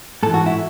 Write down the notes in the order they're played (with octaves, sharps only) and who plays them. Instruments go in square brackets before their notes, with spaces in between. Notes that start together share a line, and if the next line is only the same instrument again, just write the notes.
[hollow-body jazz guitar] G#2 E3 A4
F#4
E4